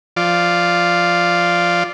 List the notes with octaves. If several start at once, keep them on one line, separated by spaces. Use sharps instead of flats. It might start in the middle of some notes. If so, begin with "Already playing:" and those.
F3 F4 D5